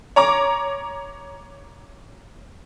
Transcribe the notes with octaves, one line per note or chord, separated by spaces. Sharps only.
C#5 A#5 D6